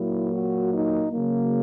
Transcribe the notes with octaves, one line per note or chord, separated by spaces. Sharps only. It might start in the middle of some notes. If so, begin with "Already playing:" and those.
Already playing: A#2 F#3 A#3 E4
F#4
D#4
C#3 F#3 A#3